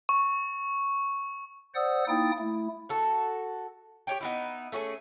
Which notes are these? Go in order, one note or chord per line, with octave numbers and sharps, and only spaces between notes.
C#6
C5 D5 F#5 D#6 E6
A#3 D#4 E4 G5 D#6 A6
A3 E4
F#4 A4
G4 C#5 G5
B3 D#4 E4
A3 C#4 F#4 G#4